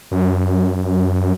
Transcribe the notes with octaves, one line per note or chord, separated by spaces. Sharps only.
F#2